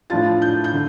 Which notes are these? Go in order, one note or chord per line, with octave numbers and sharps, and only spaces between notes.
A2 F3 D4 F4 A6
G6
G6
D3